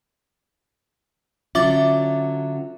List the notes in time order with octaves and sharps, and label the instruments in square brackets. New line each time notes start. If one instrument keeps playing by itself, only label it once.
[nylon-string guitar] D3 F#3 C#4 [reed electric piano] F4 [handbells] E5 D6 A6